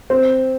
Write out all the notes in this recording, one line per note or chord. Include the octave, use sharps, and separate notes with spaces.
C4